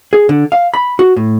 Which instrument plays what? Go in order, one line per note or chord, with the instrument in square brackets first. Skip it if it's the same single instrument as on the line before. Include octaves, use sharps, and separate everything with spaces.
[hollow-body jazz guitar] G#4
D3
F5
B5
F#4
A2